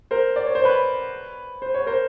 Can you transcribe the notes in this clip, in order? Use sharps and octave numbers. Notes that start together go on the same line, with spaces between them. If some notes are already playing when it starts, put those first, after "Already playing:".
A#4 C5
D5
C#5
C5
B4 C#5
C5
C#5
A#4 C5